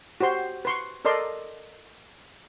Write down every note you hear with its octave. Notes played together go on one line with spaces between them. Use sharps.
F#4 G4 C5 C6
B4 C6 C#6
A4 A#4 D5 D#5 C6